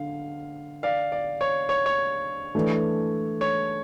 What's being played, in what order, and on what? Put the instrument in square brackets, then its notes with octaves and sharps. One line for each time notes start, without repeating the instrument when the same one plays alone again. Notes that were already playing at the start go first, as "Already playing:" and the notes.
Already playing: [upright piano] D3 [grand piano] F5
[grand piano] D5 F5
D5
C#5
C#5
C#5
[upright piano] E3 A3 D4
[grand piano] C#5